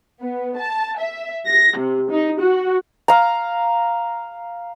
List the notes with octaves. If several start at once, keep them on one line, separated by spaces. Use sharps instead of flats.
B3
A5
E5
A#6
C3
D#4
F#4
F5 A#5